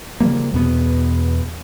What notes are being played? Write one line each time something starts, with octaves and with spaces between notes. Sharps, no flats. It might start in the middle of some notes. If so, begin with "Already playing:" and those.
C#3 F3 G3 A#3
E2 B2 B3